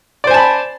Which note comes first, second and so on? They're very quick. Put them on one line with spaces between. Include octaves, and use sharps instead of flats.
D5 C5 G#5 A5 B5